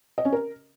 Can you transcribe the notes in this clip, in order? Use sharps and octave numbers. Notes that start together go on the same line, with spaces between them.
D#5
C#4
A#4